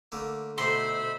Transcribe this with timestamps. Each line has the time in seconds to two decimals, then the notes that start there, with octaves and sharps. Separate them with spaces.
0.12 D3 A3 A#3
0.58 B2 D3 A3 D#4 C5 E5 B5 C6